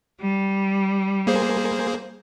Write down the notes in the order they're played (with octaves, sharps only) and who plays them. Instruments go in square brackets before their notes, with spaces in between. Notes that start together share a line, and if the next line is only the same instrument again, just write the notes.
[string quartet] G3
[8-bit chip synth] A#3 G#4 C5